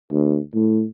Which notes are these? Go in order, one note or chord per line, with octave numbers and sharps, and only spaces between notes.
D2
A2